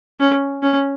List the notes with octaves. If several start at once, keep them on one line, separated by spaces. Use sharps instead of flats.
C#4
C#4